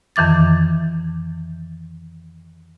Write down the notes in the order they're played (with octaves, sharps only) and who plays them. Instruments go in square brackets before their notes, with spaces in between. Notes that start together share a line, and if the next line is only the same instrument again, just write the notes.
[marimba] F2 D#3 E3 D6 A6